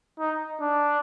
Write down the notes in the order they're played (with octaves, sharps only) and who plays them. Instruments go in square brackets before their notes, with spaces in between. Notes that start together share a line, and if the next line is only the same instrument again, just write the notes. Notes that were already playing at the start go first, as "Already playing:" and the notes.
[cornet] D#4
D4